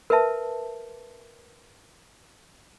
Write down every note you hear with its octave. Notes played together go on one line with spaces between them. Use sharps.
A#4 B4 E5 A5